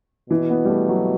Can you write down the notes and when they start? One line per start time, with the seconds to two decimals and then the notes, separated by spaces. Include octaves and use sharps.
0.30 B2 E3
0.50 B3
0.65 G3
0.69 A3
0.89 F#3